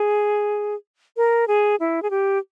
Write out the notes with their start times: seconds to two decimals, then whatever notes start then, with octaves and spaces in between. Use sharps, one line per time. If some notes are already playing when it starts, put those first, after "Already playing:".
Already playing: G#4
1.17 A#4
1.48 G#4
1.80 E4
2.02 G#4
2.11 G4